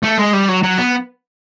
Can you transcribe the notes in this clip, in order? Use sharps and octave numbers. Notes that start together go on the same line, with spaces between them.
A3
G#3
G3
F#3
F#3
B3